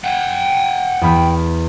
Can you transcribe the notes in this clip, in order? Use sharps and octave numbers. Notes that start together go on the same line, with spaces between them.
F#5 G5
E2 B5 F6